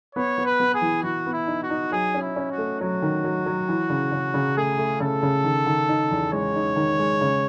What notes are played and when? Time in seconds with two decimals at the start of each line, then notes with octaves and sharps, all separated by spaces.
0.15 B3 C#5
0.38 B3
0.45 B4
0.60 B3
0.74 G#4
0.81 E3
1.03 E3 F#4
1.26 B3
1.33 E4
1.47 D#4
1.63 F#4
1.70 D#4
1.92 F#3 G#4
2.15 C#4
2.22 E4
2.36 C#4
2.51 F#4
2.58 A3
2.80 F#3 F#4
3.02 D#3
3.24 F#3
3.46 F#3
3.69 E3
3.90 C#3
4.12 C#3
4.34 C#3
4.57 A3 G#4
4.78 A3
5.00 C#3 A4
5.23 C#3
5.44 D#3
5.66 D#3
5.89 D#4
6.11 E2
6.32 G#3 C#5
6.55 D#4
6.76 D#3
6.99 G#3
7.21 C#3